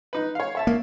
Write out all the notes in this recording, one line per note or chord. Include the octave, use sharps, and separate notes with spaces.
D#4 B4
C#5 F5
C#5 E5 A5
A#3